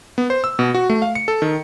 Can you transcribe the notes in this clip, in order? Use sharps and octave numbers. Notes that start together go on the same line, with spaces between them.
B3
C5
E6
B2
F#4
A3
F5
C#7
A4
D#3